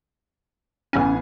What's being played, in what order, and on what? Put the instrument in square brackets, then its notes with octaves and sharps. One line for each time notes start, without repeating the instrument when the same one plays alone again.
[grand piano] A1 B3 G#5 [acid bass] C#4